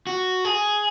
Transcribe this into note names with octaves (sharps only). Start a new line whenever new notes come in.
F#4
G#4